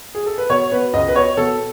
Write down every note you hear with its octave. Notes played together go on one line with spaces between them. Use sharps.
G#4
A4
B4
B2 C#5
B2 B4
C#2 D#5
B4
B2 C#5
B2 A4